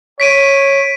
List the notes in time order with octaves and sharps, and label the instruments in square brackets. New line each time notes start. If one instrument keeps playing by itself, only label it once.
[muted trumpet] C#5 [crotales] B6 D7 D#7